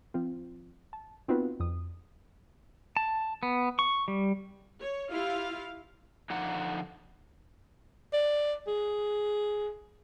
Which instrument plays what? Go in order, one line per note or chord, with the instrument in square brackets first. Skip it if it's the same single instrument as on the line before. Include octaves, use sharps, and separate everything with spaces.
[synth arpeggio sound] F3 C4 F4
A5
B3 C4 D#4 F4 F#4 B4
F2 D#6
[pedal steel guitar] A5
B3
C#6
G3
[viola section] C#5
E4 F4 G4 F5
[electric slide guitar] D3 F3 D#4 F#5
[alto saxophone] D5
G#4